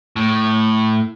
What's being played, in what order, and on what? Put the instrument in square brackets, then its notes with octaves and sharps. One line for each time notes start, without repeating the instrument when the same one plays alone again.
[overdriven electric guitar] A2